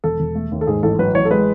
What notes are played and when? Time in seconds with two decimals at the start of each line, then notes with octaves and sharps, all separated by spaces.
0.04 E1 A4
0.20 E1
0.35 A3
0.52 D#2
0.61 A4
0.67 G#2 G#4
0.83 A1 A4
0.99 F#3 B4
1.14 A1 C#5
1.25 A4
1.31 G#3 B4